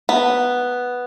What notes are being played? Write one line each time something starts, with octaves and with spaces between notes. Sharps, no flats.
B3